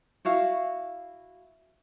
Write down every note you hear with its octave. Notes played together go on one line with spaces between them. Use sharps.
E4 F#4 F5